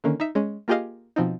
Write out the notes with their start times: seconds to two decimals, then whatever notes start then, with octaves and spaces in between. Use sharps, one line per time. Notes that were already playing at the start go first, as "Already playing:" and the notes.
0.04 D3 D#3 A#3 C#4
0.20 D#4 E5
0.35 G#3 C#4
0.68 A#3 F4 G4 G#4 D#5 F5
1.16 B2 F3 C4 D#4